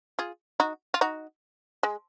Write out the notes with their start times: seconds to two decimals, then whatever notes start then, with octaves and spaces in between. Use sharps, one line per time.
0.19 F4 G#4
0.60 D#4 F#4
0.94 F4
1.01 D#4 F#4
1.83 G#3